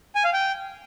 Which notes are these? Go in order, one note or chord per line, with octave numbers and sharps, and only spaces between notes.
G#5
F5
G5